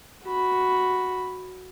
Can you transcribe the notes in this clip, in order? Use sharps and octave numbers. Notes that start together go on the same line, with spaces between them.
F#4 B5